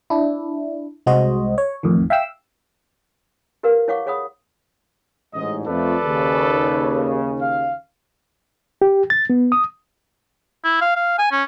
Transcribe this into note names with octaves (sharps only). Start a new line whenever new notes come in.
D4 E4
C2 G#3 F#4 C5 D#5
C#5
A1 F2 A2 D#3
E5 F5 G5 E6
G4 A#4 B4 F5
E4 C#5 F5 F#5 C#6 D6
G#4 C#5 F#5 B5 D#6
A1 G#2 D#5
F2 A3 A4 B4 D5
D#2 C#3
F5
G4
A6
B3
D#6
E4
F5
F5
G#5
C#4